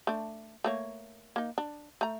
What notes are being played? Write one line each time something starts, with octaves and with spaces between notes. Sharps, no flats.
A3 D4
A3 A#3 C#5
A#3 D#4
D4
A3 A#5